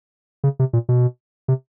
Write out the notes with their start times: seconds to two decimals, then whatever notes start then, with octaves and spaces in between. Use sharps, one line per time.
0.44 C#3
0.59 C3
0.73 A#2
0.89 B2
1.48 C3